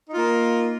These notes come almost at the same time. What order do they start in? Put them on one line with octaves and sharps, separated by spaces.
D#4 F4 A#3